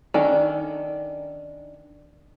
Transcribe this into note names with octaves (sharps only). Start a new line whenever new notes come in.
D#3 C#4 D4 A4 D5